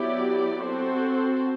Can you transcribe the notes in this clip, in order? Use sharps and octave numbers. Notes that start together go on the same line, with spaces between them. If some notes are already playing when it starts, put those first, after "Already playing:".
Already playing: F#3 B3 E4 G4 D5
C4 F#4 A4 C5